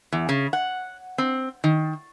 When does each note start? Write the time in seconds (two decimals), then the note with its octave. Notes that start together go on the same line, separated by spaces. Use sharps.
0.12 E2
0.29 C#3
0.53 F#5
1.18 C4
1.64 D#3